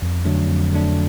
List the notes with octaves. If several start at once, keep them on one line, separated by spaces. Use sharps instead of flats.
F2
D3 F#3 A3 D4
F2
D3 F#3 A3 D4